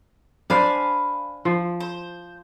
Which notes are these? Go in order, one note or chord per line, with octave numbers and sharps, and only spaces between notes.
D4 C5 D5 F5 G#5 B5
F3
C5